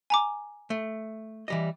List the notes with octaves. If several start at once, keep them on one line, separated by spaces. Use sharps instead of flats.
G#5 A#5 D6
A3
E3 G3 D#5